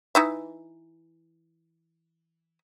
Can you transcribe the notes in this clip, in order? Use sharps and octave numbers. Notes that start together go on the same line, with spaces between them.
E3 D#4 E5